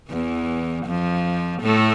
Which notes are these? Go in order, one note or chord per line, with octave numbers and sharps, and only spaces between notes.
E2 E3
F2 F3
A2 A3